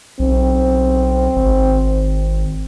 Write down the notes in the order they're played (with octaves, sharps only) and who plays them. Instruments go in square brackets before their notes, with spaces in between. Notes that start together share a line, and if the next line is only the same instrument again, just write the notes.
[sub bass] B1 [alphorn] C4
[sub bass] G#1